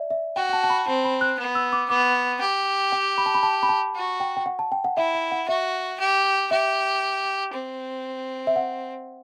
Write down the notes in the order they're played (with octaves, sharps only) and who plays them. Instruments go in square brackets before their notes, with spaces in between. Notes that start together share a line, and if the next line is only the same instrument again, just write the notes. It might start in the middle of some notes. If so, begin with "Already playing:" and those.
Already playing: [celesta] D5 E5
E5
[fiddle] F#4 [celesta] G5
[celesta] G5
A5
A5
B5
[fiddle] C4 [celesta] A5
[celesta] B5
F#6
[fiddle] B3
[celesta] E6
D6
[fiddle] B3 [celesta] D6
[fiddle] G4
[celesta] G5
B5
A5
B5
A5
B5
A5
[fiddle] F#4
[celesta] G5
G5
F#5
A5
G5
F#5
[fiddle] E4 [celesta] E5
[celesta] E5
F#5
[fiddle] F#4 [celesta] E5
[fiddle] G4
[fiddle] G4 [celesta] E5
[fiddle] C4
[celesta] E5
F#5